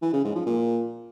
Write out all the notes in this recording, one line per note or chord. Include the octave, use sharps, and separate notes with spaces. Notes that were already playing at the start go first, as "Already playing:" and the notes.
E3
C#3
G#2
F3
A#2